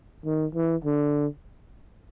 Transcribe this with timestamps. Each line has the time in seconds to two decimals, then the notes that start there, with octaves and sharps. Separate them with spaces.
0.25 D#3
0.55 E3
0.84 D3